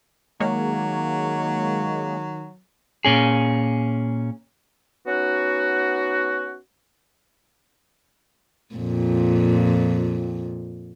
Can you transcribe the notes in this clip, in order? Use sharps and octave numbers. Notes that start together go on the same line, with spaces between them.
D#3 F#3 G#3 A#3 C#5
A#2 C#4 G#4
B3 C#4 D#4 F#4
F2 A#2